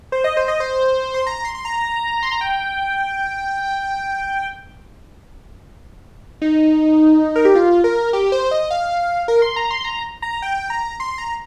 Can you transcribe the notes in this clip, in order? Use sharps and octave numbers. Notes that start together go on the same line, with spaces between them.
C5
D#5
C5
D#5
C5
C6
A#5
C6
C6
A#5
C6
A#5
G5
D#4
A#4
G4
F4
A#4
G4
C5
D#5
F5
A#4
C6
A#5
C6
A#5
A#5
G5
A#5
C6
A#5